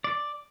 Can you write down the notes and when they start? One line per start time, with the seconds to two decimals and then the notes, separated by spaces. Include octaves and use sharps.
0.04 D5